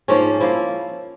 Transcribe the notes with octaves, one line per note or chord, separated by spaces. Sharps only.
G#2 F3 A#3 C#4
F3 A#3 E4